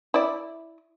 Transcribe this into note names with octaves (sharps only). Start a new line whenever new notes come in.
E4 D5